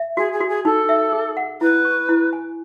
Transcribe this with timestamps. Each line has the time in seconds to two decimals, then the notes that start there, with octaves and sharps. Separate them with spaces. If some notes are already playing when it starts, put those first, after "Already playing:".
Already playing: E5
0.17 F#4 G#4
0.32 G#4
0.41 F#4
0.48 G#4
0.64 D#4 A4
0.89 E5
1.12 G#4
1.37 F#5
1.61 E4 B4
1.85 C#6
2.09 E4
2.33 G#5